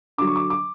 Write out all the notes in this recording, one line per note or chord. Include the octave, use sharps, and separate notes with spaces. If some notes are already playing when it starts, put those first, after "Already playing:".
D3 F#3 D6
C#6
D6
D6